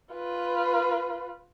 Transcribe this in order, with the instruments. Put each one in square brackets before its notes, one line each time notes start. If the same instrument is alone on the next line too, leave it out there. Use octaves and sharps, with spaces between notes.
[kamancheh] F4 B4